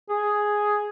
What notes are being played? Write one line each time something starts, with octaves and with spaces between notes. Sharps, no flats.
G#4